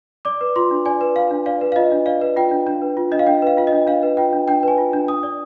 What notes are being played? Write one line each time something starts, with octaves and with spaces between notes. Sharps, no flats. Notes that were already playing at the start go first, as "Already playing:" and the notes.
D5 D6
B4
F4 C6
D4
D5 G#5
B4
F4 F5
D4
D5 F5
B4
F5
F4 D#5
D4
D5 F5
B4
F4 G5
D4
D4
B4
F4
D4 D#5
F5
D4 G5
B4 F5
F4 F5
D#5
D4
D4 F5
B4
F4 G5
D4
D4 G5
B4 G#5
F4
D4
D4 D#6
D5